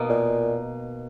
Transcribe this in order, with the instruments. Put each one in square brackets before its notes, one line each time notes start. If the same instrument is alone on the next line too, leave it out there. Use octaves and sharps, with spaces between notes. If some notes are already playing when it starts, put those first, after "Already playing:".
Already playing: [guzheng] B2 A#3 D#4
[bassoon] A#2